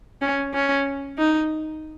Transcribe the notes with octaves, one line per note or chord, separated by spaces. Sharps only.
C#4
C#4
D#4